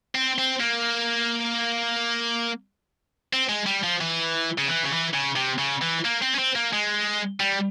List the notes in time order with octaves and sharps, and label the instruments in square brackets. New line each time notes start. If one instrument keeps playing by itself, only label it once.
[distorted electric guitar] C4
C4
A#3
C4
G#3
G3
F3
E3
C#3
E3
C#3
E3
C#3
C3
C#3
E3
A#3
C4
C#4
C4
A#3
G#3
G3